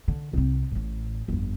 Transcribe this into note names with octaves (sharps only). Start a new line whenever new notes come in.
D3
C2 C4
A1 A2
G1 F2